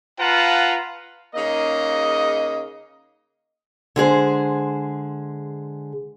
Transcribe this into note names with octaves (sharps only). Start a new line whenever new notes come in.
F4 B4 F5 F#5 A5 A#5
C#3 A#3 D#4 D#5
D3 G#3 G#4 C5